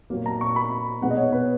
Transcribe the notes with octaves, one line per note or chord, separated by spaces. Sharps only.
A#2 F#3 A#3
A#5
C#6
B5
B2 G#3 B3 F#5
D#5
C#5
B4